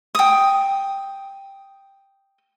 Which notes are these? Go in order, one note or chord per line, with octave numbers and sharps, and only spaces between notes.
G5 D#6